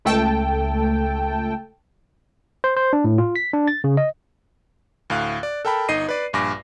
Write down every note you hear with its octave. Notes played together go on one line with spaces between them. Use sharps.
C#2 A3 A4 G5 A5
C5
C5
D4
A2
F4
B6
D4
A6
C#3
D#5
D2 A2 F5 F#6
D5
A4 A#4 G5 A5 B5
G1 D#4 D#5 C7 D#7
B4 D5
A#1 G2 G#5 D6 A#6